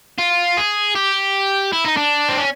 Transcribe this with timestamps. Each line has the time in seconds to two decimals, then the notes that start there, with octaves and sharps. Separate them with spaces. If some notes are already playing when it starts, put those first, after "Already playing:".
0.19 F4
0.57 G#4
0.96 G4
1.72 E4
1.85 D#4
1.97 D4
2.29 C4
2.39 C#4